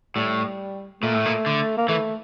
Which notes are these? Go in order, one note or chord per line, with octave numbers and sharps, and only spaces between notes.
A2 G3
A#2 A3
A2
A#2
D3
A#3
E3 A3